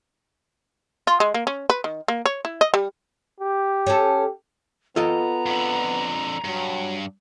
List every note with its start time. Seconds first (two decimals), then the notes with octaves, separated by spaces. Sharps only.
1.07 F4
1.20 G#3
1.34 A#3
1.47 C#4
1.70 B4
1.84 D#3
2.08 A#3
2.26 C#5
2.45 E4
2.61 D#5
2.74 G3
3.40 G4
3.87 C#4 A4
4.96 B3 F4 A4 D#5 A#5
5.46 F2 D3
6.44 G2 F#3